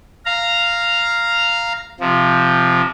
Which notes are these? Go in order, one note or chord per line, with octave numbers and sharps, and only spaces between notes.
F5 A#5
C3 F3